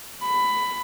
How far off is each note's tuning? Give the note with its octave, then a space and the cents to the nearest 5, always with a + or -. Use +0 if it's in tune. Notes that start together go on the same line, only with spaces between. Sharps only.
B5 +15